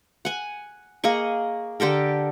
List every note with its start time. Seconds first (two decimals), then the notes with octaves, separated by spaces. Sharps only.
0.25 F#5 G#5
1.04 A#3 G#4 D#5 C#6
1.80 D3 G4 A4 A#4